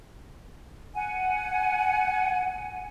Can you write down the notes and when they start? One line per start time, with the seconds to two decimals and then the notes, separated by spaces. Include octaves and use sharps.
0.94 F#5 G#5